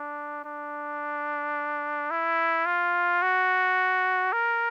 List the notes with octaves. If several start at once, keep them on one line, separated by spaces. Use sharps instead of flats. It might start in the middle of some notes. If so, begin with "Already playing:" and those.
Already playing: D4
D4
E4
F4
F#4
A#4